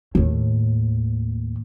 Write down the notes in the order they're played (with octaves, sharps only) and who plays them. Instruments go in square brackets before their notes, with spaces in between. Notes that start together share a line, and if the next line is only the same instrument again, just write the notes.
[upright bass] D#2 A2